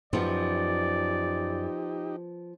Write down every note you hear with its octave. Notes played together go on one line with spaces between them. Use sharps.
F#2 F3 B3 D#4 G4 D5